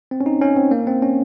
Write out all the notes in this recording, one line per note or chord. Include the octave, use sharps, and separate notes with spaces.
C4
C#4
D#4
C#4
C4
A#3
C4
C#4